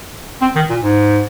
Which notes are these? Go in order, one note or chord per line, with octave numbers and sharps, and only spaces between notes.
C4
D#3
A#2
G#2